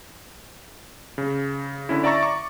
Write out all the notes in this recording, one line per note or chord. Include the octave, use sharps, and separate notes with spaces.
C#3
D3 C#4 E4
D5 E5 A#5 C#6 A6
C#6 D6